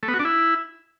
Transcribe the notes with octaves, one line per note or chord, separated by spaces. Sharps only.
A3
B3
F#4
D4
E4